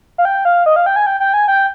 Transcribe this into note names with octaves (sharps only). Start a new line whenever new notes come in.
F5
G5
F5
D#5
F5
G5
G#5
G5
G5
G#5
G5